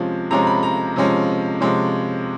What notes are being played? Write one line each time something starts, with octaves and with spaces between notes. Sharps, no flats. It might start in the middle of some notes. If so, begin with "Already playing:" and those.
Already playing: C3 F3 G#3 C#4
C3 F3 G#3 C#4 A#5
B5
A#5
C3 F3 G#3 C#4
C3 F3 G#3 C#4